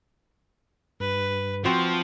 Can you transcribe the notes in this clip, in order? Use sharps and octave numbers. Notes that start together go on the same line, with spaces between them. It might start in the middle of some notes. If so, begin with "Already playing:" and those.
G2 B4
F3 C4 F#4 B4